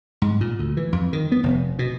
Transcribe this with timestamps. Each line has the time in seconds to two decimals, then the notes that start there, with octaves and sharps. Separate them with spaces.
0.22 G#2
0.41 A#2
0.59 D2
0.77 E3
0.92 F2
1.13 D#3
1.32 B3
1.43 F1
1.79 B2